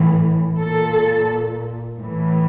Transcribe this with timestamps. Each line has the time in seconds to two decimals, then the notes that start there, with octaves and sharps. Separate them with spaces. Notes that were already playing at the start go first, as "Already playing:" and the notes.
Already playing: A2 E3
0.60 A#2 A4
1.98 A2 E3